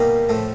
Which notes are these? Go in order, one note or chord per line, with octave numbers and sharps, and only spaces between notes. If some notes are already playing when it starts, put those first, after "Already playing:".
Already playing: B2 G3 A#3 D#4
A2 F3 A3